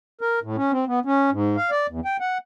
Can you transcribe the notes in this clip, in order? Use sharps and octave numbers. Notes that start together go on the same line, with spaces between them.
A#4
A2
C#4
C4
B3
C#4
G#2
F5
D5
E2
G5
F#5